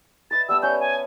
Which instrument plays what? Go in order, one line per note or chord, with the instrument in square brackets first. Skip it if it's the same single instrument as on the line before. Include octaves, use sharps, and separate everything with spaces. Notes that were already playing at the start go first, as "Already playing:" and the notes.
[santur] B4 D#5 E5 [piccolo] A6
[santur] G3 B3 A5 [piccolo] E6
[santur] C#4 B4 C#5 [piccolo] G6
[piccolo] G#5